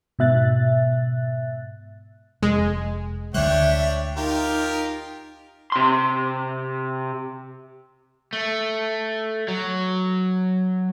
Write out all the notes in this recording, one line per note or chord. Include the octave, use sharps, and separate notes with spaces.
G#2 B2 E5 F#6 A6
F1 G#3
D2 G#3 D4 C#5 E5 G5 F#6
D#4 F4 G4 A#4
C3 C6
A3
F#3